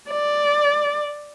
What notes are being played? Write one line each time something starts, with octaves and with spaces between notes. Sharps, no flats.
D5